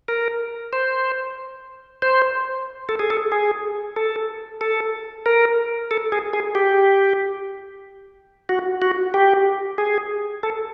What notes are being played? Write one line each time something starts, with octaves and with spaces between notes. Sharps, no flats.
A#4
C5
C5
A4
G#4
A4
G#4
A4
A4
A#4
A4
G#4
G#4
G4
F#4
F#4
G4
G#4
A4